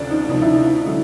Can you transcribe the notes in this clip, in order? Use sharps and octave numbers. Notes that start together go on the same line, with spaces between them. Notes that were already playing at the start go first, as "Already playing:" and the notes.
Already playing: D2 C3 F3 D4
D#4
D2 C3 F3 D#4
E4
D#4
D3 F#3